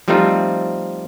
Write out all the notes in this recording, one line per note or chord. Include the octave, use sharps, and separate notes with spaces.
F3 G3 A3 C4 D#4 F4